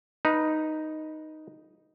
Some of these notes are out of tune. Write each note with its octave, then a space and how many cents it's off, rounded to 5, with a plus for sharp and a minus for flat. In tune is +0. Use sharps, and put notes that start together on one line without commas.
D#4 +0 B4 -15